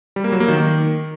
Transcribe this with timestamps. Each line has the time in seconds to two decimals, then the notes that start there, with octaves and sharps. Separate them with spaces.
0.16 G3
0.24 A#3
0.32 F#3
0.40 A#3
0.48 D#3